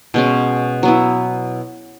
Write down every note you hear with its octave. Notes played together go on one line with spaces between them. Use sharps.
B2 G#3 C#4
F#3 B3 E4